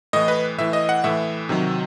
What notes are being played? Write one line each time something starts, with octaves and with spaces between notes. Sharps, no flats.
A2 E3 D#5
B4
A2 E3 E5
D#5
F#5
A2 E3 E5
C3 D#3 F#3